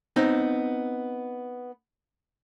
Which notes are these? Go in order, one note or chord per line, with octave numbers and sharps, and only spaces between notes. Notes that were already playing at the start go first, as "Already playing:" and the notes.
B3 C4 D#4